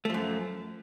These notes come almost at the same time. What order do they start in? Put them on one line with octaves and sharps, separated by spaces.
A3 F3 F#2